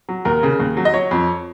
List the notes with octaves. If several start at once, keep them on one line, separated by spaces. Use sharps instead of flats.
F#3
D#2 A#4
C#3
D#2
F#3
D#5
F#3 C#5
F2